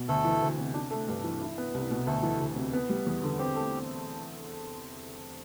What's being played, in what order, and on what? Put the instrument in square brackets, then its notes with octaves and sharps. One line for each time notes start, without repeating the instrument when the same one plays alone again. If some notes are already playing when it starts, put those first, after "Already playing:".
Already playing: [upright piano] B2
[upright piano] D2 [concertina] A3 A4
[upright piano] E3
D2
C3
D4
A3
G2
E3
E4
B3
C2
B2
[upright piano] D2 [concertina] A3 A4
[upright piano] E3
D2
C3
B3
G3
E2
D3
[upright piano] C4 [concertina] G4
[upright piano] A3